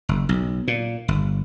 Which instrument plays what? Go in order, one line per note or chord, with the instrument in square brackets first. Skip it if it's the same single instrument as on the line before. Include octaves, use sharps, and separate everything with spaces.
[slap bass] F#1
B1
A#2
G1